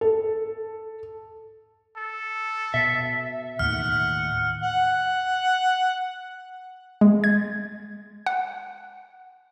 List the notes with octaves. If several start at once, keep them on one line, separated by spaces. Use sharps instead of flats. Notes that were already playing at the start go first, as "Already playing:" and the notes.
A4
A4
B2 E5
D#2 A2 D#3 F#5 F6
F#5
G#3
G#6
F#5